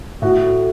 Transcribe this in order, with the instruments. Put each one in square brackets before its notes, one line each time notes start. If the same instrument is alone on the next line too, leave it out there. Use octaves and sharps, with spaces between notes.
[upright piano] A2 F#4